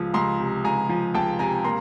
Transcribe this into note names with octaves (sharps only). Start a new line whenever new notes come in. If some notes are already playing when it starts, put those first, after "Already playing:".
Already playing: C#2 F3
C#2 A#5 C6
C3
C#2 G#5 A#5
F3
C#2 G5 A5
C3 G#5 A#5
A#3 A#5 C6